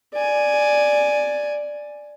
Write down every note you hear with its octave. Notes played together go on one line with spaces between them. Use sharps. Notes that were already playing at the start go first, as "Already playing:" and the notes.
D5 G#5